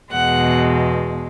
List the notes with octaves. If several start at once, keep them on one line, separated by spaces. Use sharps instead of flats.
E2 B2 G#3 F#5